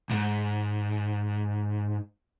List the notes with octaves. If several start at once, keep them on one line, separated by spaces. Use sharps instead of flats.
C#2 G#2